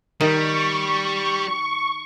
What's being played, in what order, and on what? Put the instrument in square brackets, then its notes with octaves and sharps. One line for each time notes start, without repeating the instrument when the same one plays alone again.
[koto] D#3 [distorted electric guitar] G3 [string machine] C#6